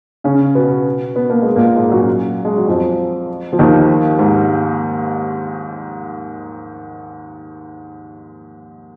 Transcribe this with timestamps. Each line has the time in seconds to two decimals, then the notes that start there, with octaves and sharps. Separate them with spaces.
0.24 C#3 C#4
0.55 B2 B3
1.16 B3
1.30 A#3
1.42 G#3
1.56 A#2 A#3
1.76 G#2 G#3
1.91 F#2 F#3
2.45 G#3
2.57 F#3
2.67 F2 F3
3.53 F3
3.59 D#2 D#3
4.19 G#2